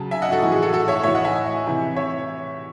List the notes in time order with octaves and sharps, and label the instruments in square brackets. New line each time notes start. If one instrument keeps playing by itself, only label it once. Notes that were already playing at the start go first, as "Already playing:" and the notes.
Already playing: [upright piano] C#3 F#3 A5
E5 G#5
D#5 F#5
F#4 A4
A2 E3 F#4
G#4
F#4 A4
F#4 A4
C#5 E5
A2 E3 C#5 E5
D#5 F#5
E5 G#5
C3 E3
C#5 E5